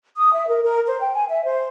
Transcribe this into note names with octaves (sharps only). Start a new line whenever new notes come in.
D#6
E5
A#4
A#4
C5
G5
G#5
E5
C5